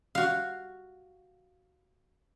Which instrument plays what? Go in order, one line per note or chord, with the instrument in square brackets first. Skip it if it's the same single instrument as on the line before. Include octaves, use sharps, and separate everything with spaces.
[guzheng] F#4 F5